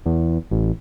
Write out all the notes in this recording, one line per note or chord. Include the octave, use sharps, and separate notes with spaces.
E2
A1